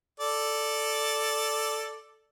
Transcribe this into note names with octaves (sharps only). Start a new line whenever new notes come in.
A4 D5